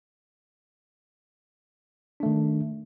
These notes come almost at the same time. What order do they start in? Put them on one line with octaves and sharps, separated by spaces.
D4 A3 D#3